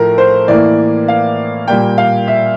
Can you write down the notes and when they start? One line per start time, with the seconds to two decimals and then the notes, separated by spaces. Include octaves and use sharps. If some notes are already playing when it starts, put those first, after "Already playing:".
Already playing: A2 F3 A3 A#4
0.18 C5
0.48 A2 E3 A#3 D5
1.08 F5
1.68 A#2 G3 A#3 G5
1.98 F5
2.28 E5